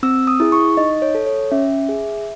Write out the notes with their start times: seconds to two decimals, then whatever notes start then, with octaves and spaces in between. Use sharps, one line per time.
0.03 C4 E6
0.27 D#6
0.40 E4 G#4
0.52 C#6
0.77 D#4 D#5
1.02 C#5
1.15 A4
1.27 C#5
1.52 C#4 E5
1.89 G#4